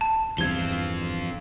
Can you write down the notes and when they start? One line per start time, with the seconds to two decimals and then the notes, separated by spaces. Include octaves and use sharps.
0.01 A5
0.38 E2 G2 C3 F3 C4 F4 G#6 G7